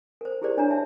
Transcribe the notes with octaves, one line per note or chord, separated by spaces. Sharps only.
A#4 C5
E4 G4 G#4 A#4 C5 D5
D4 C#5 A#5
E5 A5